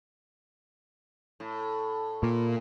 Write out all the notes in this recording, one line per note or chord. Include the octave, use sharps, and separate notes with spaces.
A2
A#2